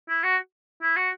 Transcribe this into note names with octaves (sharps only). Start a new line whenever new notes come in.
E4
F#4
E4
F#4